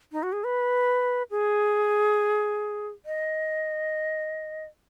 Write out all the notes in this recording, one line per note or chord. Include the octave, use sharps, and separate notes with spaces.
D#4
F#4
G#4
B4
G#4
D#5